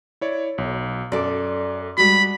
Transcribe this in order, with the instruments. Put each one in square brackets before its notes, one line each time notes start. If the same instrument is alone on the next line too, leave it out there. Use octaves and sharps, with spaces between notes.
[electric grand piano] E4 C#5 D5
B1
[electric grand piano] F#2 D6 [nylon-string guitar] A4 D5
[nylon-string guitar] G3 G#3 F#4 [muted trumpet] B5